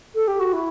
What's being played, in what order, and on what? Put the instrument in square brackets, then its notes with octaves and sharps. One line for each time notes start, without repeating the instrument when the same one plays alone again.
[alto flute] A4
G4
F#4
E4